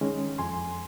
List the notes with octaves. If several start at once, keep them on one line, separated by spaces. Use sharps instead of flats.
D#3 G#3 C#4
F2 G#5 C6